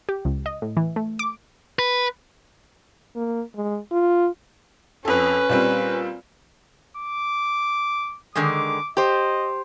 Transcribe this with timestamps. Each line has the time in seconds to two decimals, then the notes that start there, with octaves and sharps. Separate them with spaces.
0.09 G4
0.25 C#2
0.46 D#5
0.62 A2
0.77 E3
0.96 A3
1.19 D6
1.79 B4
3.15 A#3
3.56 G#3
3.91 F4
5.05 F2 C#4 A4 B4
5.49 A#2 G3 C4
6.97 D6
8.35 D3 D#3 G#3 D6
8.97 G4 C5 D#5